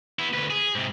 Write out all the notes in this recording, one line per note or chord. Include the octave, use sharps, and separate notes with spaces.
B3 E4
D2 B4
G#4
G#2 C3